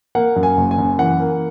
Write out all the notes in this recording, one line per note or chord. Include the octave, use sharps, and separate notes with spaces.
A#3 F#5
F#2
G#5
F#1
G#5
F#2
E3 F#5
A#3